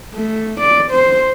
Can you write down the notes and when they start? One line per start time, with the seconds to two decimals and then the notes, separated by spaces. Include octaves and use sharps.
0.14 A3
0.60 D5
0.91 C5